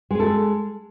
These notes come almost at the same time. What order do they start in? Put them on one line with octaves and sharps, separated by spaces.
G#3 G#4 A4